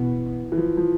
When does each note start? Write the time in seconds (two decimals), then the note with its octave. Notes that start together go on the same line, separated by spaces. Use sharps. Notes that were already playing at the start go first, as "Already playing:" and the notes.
Already playing: B2 E3 B3
0.52 E3
0.57 F3
0.77 F3